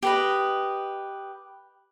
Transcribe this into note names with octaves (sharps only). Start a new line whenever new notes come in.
G4 B4 D#5